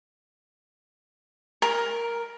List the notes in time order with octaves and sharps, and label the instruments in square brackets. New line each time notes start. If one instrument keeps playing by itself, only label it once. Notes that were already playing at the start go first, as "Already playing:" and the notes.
[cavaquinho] A#4